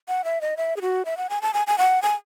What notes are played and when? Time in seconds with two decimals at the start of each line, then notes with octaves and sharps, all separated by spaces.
0.08 F#5
0.24 E5
0.41 D#5
0.57 E5
0.76 G#4
0.81 F#4
1.05 E5
1.17 F#5
1.30 G#5
1.42 A5
1.54 G#5
1.67 G#5
1.78 F#5
2.02 G#5